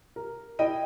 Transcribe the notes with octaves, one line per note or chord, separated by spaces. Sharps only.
A#4
E4 D#5 G5 D#7